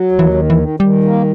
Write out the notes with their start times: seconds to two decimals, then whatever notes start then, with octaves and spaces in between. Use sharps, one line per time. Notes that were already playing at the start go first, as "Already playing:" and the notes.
Already playing: F#3
0.12 D#2
0.19 E3
0.34 D#3
0.50 E3
0.57 D#3
0.80 D#3 G3
1.04 A#3